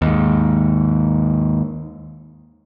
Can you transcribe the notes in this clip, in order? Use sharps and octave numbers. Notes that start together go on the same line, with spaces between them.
D#2 G#2